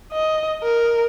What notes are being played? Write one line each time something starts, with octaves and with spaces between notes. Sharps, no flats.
D#5
A#4